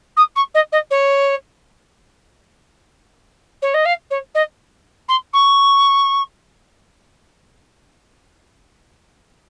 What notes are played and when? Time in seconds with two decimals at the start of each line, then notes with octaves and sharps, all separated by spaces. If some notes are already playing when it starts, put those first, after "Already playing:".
0.16 D#6
0.35 C#6
0.54 D#5
0.72 D#5
0.90 C#5
3.62 C#5
3.74 D#5
3.85 F5
4.10 C#5
4.35 D#5
5.08 C6
5.33 C#6